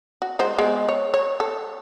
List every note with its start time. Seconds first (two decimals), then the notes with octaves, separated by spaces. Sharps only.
0.22 F#4
0.39 G#3 F#4 C5
0.58 G#3 B3
0.89 C#5
1.14 C#5
1.40 A4